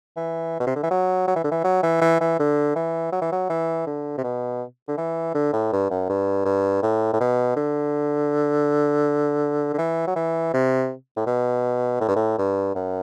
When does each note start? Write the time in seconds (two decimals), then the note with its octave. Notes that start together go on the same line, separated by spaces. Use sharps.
0.17 E3
0.60 B2
0.67 C3
0.76 D3
0.83 E3
0.91 F#3
1.28 F#3
1.36 E3
1.44 D3
1.51 E3
1.64 F#3
1.83 E3
2.01 E3
2.21 E3
2.39 D3
2.76 E3
3.12 F#3
3.22 E3
3.32 F#3
3.49 E3
3.87 D3
4.18 C3
4.24 B2
4.88 D3
4.97 E3
5.34 D3
5.53 A2
5.72 G2
5.90 F#2
6.09 G2
6.45 G2
6.83 A2
7.13 A2
7.20 B2
7.56 D3
9.74 D3
9.78 E3
10.07 F#3
10.16 E3
10.54 C3
11.17 A2
11.26 B2
12.01 A2
12.08 G2
12.16 A2
12.38 G2
12.75 F#2